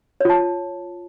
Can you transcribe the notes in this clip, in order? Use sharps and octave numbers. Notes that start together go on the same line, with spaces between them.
F4 C#5 A5